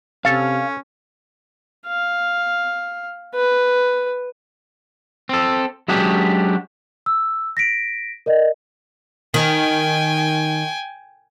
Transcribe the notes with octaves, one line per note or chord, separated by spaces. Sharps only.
C3 C#4 A4 F5
F5
B4
C4 A4
F#3 G#3 C#4 D4 F#4 G4
E6
A#6 B6 D7
A#4 D5 D#5
D#3 G5 G#5